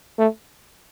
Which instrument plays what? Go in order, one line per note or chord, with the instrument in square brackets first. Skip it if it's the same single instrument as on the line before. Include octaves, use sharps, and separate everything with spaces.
[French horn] A3